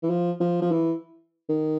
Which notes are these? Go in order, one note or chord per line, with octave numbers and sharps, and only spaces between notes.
E3
F3
F3
F3
E3
D#3